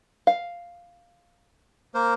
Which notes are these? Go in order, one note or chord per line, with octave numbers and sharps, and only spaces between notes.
F5
A#3 A#4 C5